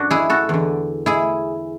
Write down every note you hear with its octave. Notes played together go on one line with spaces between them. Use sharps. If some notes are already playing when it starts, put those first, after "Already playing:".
Already playing: F#2 D4 F#4
E4 G#4
F#4 A4
E2 D3
E4 G#4